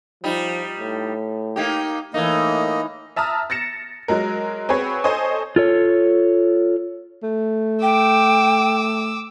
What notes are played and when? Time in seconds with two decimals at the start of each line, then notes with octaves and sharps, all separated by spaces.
0.24 F3 G3 D#4
0.79 A2
1.56 A#3 D#4 G4
2.14 A2 E3 A#3 D#4 D#5
3.16 E5 A5 A#5 D#6 F6
3.50 A6 A#6 C#7 E7
4.08 F#3 G#3 A#4
4.69 C4 F#4 G#4 B4 C#5
5.04 A4 C5 C#5 D#5 G#5
5.56 F4 A4 C#5
7.23 A3
7.83 G5 D6 E6